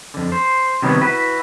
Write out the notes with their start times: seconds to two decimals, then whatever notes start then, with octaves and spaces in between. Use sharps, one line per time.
0.14 F2 D3
0.32 C5
0.82 C3 D#3 F#3 G3 B3
1.01 E4 F#4 B4